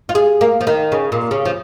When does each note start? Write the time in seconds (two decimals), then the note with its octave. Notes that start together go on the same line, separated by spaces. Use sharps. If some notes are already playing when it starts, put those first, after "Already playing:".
0.09 F4
0.15 G#4
0.41 A#3
0.61 F3
0.67 D#3
0.92 C#3
1.12 A#2
1.31 C#3
1.45 F3